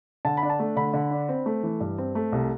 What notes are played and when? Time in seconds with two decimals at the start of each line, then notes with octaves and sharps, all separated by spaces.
0.25 D3 A5
0.37 B5
0.43 D4
0.50 A5
0.60 A3
0.76 D3 B5
0.94 D3
1.11 D4
1.29 C4
1.46 A3
1.63 E3
1.80 G2
1.98 C4
2.15 A3
2.32 C2